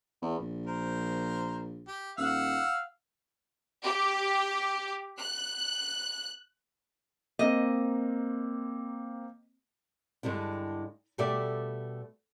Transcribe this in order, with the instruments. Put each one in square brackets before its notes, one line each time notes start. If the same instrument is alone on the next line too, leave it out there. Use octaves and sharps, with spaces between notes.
[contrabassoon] E2
A#1
[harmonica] A#4 C5
G4
[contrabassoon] D#1 [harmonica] F5 F#5 E6
[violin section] G4
F#6
[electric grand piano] A#3 C4 [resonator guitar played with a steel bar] D#5
[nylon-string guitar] G2 D3 G3 G#3 E4
B2 G3 A3 G4 D5 E5